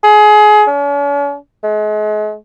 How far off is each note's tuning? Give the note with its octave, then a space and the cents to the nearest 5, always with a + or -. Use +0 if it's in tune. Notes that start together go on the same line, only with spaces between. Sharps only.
G#4 +25
C#4 +45
G#3 +40